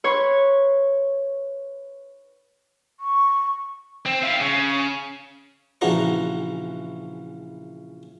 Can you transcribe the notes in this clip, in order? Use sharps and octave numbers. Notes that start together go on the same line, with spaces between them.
B4 C#5 C6 C#6
C#6
C4
E4 F4
C#3
A#1 C#3 E3 F#4 F#5 A#5